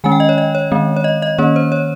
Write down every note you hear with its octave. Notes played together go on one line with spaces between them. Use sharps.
D#3 G#3 C#4 G#5
G5
D#5
C#5
D#5
C#5
D#3 G#3 C4
C#5
D#5
D#5
D#3 A#3 C#4 C#5
C5
C#5